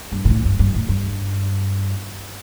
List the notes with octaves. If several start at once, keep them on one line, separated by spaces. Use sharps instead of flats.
G2
A#2
A2
G2
G2
A2
G2